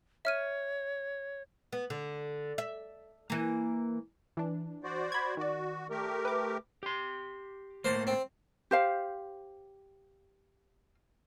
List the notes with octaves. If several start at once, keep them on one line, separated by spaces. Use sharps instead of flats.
C#5 E5 F6 D#7
B3
D3
E5
E3 A#3
E3 D4
F#4 C5 D5
B5 G#6
D#3 F#4 D5
A3 G4 A#4
B4 D6
G4 C6
A2 A3 A#3 C5 C6
C4
G4 C5 F5